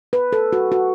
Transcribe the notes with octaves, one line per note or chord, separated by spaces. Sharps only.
B4
A4
F#4
F#4